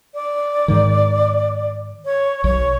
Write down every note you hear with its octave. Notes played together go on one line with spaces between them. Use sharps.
D5
G#2 D#3
C#5
B1 C#5